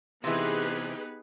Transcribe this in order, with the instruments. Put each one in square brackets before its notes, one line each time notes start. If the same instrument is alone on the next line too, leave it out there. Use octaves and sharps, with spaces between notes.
[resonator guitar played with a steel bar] C3 E3 [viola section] B3 G#4 B4 [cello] D#4 G4